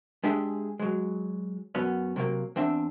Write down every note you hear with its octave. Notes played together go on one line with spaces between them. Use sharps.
G#3 D4 G4 G#4 E5
F#3 G#3
F#2 B3 C#4
C3 F#3 G#3 A#3
E2 C4 D4 E5